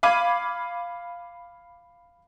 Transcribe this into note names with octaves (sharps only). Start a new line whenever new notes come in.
F5 B5 D6 G#6 D#7